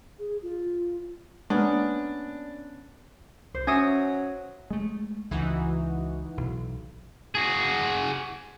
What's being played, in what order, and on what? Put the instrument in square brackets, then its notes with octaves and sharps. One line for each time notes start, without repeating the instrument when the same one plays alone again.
[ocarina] G#4
F4
[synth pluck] G#3 A#3 [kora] B3 C#4 [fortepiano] D4
[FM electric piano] C2 [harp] C5
[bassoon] F#3 [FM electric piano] C#4 [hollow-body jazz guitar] C#5 E5 G#5 [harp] D#6 A#6
[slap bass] G#3 A3
[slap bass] C#2 [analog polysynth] E3 D#4 F#4
[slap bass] B1
[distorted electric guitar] F#4 G#4